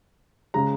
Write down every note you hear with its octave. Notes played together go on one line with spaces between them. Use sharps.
C#3 G#3 A#5